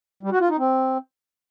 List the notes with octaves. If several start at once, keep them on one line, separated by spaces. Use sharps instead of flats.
G3
F#4
F4
D#4
C4